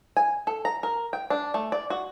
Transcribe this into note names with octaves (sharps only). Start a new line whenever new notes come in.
G#5
A4
A#5
A#4
G5
D4
A3
D5
F#4